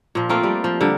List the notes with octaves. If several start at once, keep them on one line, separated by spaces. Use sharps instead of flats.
A#2 F3
A3 A#3 C4 F4
G3 D5
F3
D3 G3 A#4